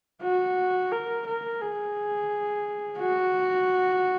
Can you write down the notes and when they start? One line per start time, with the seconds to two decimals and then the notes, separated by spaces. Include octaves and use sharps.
0.23 F#4
0.92 A#4
1.27 A#4
1.61 G#4
2.99 F#4